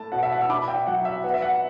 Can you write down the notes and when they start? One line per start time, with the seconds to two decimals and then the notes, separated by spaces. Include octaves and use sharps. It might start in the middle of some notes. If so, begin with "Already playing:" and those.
Already playing: A2 A3 A5
0.12 B2 F#5
0.23 E5
0.33 F#5
0.41 E6
0.49 D4 B5 D6
0.68 E5 G5
0.87 F#3 F#5
1.05 E5
1.24 B3 F#5
1.34 E5
1.42 F#5